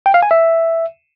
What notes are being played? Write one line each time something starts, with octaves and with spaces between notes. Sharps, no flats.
G5
F5
G#5
E5